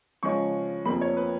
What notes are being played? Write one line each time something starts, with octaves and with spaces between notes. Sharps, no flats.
C#3 F3 G#3 C#4 C#6
F2 F3 A#3 B5
C#5
B4